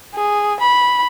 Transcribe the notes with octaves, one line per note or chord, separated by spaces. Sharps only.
G#4
B5